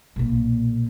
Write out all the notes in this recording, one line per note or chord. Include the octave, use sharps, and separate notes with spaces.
B1 A#2